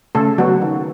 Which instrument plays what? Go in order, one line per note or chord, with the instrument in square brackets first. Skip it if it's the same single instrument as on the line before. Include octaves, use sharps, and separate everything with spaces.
[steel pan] C#3 A3 A4
F#3 B3 F#4
D#3